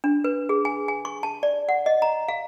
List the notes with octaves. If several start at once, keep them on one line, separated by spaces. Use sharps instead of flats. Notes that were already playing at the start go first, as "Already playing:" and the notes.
D4
B4
G#4
G#5
G#5
C#6
A5
D5
F#5
D#5
A#5
F5